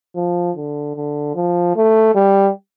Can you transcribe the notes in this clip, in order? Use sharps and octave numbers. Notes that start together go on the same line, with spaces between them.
F3
D3
D3
F3
A3
G3